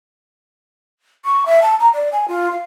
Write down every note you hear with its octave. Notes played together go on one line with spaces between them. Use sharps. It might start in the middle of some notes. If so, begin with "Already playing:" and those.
C#6
E5
A5
A#5
D5
G#5
F4
F5